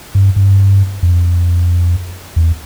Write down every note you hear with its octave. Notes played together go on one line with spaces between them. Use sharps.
G2
G2
F2
E2